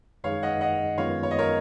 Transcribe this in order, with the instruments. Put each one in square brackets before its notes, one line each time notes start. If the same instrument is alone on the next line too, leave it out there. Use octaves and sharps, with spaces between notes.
[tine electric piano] F#2 D#3 G#3 D#4 G#4 [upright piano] C#5 F5
[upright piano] D#5 F#5
D#5 F#5
[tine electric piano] F#2 D#3 G#3 B3 F4 [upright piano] C#5 F5
[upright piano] C#5
D#5
A#4 C#5